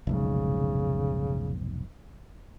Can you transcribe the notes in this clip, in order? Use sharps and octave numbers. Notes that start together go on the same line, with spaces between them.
F1 B1 G#2 C#3